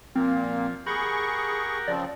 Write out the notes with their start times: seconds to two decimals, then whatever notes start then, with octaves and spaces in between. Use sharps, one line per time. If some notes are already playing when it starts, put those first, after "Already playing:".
0.16 A#2 F3 A#3 C4
0.87 G4 G#4 A#4 F#5 B5 C#6
1.88 C#3 F3 C4 D5